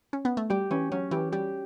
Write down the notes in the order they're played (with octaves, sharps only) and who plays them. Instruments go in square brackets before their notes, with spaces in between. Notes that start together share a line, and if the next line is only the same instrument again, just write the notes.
[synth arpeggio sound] C#4
B3
A3
[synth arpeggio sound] G3 [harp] G4
[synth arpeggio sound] E3 [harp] C#4
[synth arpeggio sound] F#3 [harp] C#4
[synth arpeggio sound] E3 [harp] G4
[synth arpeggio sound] G3 [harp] G4